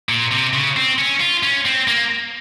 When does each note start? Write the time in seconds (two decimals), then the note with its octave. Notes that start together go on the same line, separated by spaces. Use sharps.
0.09 A#2
0.31 C3
0.53 C#3
0.77 C4
0.99 C#4
1.20 F4
1.43 C#4
1.65 C4
1.88 A#3